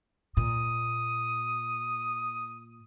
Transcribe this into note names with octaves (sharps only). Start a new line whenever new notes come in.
A#2 D#6